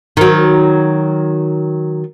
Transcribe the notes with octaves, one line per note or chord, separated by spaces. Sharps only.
D#3 F#3